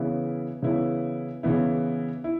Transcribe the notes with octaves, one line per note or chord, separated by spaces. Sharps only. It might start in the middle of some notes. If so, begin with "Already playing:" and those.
Already playing: C#3 E3 B3 E4
C#3 E3 B3 E4
C#3 E3 B3 E4
E4